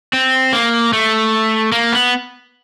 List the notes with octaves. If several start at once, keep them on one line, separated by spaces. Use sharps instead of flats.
C4
A#3
A3
A#3
B3